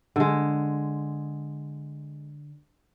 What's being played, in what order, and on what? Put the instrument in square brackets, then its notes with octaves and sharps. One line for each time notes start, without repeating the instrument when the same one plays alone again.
[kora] D3 G#3